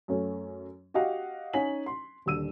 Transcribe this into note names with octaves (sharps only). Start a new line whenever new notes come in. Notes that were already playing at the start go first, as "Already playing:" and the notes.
F#2 A3 C#4
F#4 G4 D#5 F5 F#5
C#4 D#4 G#5 B6 F#7
C6
D#1 D3 E6 D#7